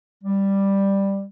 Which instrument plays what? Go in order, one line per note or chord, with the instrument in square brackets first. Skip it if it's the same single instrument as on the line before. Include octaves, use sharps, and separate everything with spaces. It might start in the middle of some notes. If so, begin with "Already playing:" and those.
[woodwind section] G3